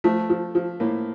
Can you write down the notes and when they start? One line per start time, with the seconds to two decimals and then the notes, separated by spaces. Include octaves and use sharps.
0.04 F3 A3
0.30 F3
0.55 F3
0.80 A2 A#3